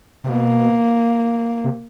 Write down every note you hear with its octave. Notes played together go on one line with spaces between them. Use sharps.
C3
B2 A#3
C3